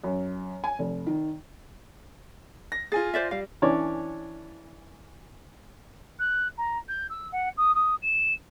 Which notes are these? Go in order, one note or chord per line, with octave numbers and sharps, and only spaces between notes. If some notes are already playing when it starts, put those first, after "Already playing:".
F#2
G#5
F1
D#3
A#6
F4 G#4 G#5 A6
C5 D5 E5
G3 F5
E3 C#4 D4 C#5 D5
F#6
A#5
G6
E6
F#5
D#6
D#6
E7